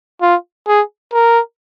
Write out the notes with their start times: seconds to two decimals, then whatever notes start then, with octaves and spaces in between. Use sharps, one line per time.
0.22 F4
0.68 G#4
1.13 A#4